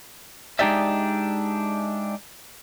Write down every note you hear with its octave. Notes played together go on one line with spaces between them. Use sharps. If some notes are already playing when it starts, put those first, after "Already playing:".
G#3 D4 D#4 G4 D5 E5